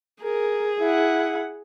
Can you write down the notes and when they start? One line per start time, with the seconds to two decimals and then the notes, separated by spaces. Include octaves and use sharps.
0.23 G#4 A#4
0.80 E4 F#5